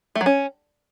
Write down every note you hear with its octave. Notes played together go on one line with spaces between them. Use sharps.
A3
F#3
C#4